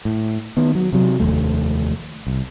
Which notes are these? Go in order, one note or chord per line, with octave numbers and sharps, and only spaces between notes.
A2
D#3 B3
F#3
C3 F#3
F1 D#2 A3
C2